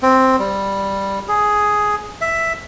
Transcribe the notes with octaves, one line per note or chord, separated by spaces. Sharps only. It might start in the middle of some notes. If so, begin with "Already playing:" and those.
C4
G3
G#4
E5